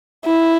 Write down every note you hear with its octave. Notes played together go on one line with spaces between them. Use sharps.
E4